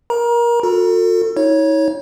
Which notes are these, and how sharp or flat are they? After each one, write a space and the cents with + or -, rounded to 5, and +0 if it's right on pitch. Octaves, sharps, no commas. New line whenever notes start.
A#4 +20 A#5 +30
F#4 -45 A4 +35
D#4 +45 C#5 +0